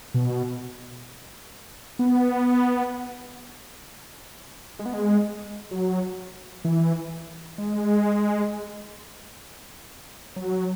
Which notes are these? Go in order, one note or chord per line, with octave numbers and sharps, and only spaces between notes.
B2
B3
G#3
B3
G#3
F#3
E3
G#3
F#3